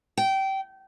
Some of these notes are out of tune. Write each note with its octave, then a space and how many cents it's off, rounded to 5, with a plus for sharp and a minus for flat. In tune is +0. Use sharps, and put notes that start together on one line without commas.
G5 -20